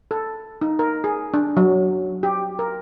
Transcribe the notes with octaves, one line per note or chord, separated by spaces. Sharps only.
A4
D#4
A#4
G#4
D4
F#3
G4
A#4